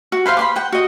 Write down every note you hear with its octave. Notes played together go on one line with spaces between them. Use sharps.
F#4
B4 C5 F5 C6
B5 C6 D6
F#5 G5
F#4 D#5